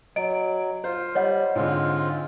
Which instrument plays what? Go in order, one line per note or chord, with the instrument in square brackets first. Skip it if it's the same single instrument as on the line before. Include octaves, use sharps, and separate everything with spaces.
[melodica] F#3 [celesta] D#5 [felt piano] D7
[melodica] F4 [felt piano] C5
[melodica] G3 [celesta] C#5 D#5 F#5
[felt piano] G#2 D3 [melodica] G#3 C4 F4